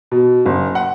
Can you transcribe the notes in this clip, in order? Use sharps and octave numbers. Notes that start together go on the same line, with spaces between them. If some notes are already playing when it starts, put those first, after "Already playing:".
B2
F#1
F#5